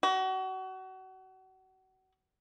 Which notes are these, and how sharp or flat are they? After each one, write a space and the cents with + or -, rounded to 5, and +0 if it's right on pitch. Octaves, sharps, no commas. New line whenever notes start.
F#4 +30